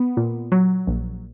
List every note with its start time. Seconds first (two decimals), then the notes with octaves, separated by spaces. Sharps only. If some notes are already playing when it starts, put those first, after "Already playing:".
Already playing: B3
0.17 A#2
0.52 F#3
0.87 A#1